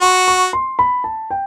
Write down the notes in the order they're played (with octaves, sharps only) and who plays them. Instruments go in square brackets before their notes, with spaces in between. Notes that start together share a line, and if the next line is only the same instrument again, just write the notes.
[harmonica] F#4 [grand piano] C6
[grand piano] C#6
C6
B5
A5
G5